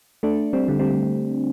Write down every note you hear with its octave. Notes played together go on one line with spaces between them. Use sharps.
A3 D4
G3 C4
D3 G3
G3 C4